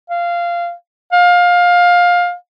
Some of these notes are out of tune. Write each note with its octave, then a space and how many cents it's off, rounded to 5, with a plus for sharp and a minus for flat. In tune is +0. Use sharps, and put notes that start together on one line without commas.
F5 -15
F5 +20